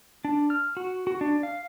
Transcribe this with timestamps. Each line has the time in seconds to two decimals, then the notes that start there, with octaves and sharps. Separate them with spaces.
0.25 D4
0.50 F6
0.77 F#4
1.07 F#4
1.21 D4
1.43 F5